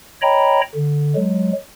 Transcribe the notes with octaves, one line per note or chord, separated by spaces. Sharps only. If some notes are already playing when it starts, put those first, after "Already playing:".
C#5 D#5 G5 A#5 B5
D3
F#3 G#3